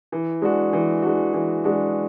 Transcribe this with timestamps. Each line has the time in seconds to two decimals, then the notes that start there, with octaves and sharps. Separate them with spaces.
0.12 E3
0.42 G#3 D4 F#4
0.73 E3
1.02 G#3 D4 F#4
1.34 E3
1.64 G#3 D4 F#4